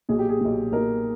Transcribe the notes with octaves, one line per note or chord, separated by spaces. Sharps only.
B1 A#2 G#4
G4
G#4
B1 A#2
B1 A#2 A#4